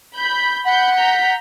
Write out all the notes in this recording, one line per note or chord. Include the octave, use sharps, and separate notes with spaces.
B5 G6
F#5 B5 G6
A#5 G6 B6